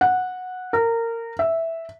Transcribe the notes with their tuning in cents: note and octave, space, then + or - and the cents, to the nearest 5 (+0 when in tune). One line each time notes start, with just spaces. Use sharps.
F#5 -10
A#4 -20
E5 -5